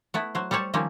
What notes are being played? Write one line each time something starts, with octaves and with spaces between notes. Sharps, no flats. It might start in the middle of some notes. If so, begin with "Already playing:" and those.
A3 B3 E4
F#3 C5
G3 A4 C5 C#5 A5
D#3 F3 G3 A#3 C4 C#4